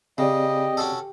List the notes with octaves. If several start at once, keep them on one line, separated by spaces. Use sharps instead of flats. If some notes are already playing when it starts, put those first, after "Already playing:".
C#3 C4 G4 G#4 D5 D#5
C#4 F#4 A4